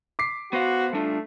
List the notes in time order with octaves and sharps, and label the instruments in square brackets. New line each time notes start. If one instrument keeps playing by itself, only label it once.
[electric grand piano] D6 B6 C7
[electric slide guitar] B3 C5 F5 [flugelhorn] F#4
[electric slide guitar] G3 D4 F4 [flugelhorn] A3